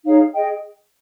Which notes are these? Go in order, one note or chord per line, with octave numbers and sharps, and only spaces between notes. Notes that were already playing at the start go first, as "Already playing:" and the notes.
D#4 G#4 C#5 F5
G#4 D#5 G5